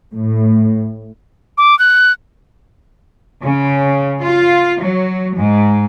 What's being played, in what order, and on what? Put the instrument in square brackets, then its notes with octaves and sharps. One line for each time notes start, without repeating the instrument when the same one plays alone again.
[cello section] A2
[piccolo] D6
F#6
[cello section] C#3
F4
F#3
G#2